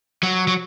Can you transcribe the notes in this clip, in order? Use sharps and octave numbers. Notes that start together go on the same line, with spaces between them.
F#3
F#3